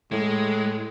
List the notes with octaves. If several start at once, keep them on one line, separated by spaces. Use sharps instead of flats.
A2 G#3